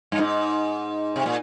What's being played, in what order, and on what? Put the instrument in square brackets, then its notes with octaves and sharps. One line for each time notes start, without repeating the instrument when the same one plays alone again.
[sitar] G2
[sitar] G#2 [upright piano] D#4
[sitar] C3
A#2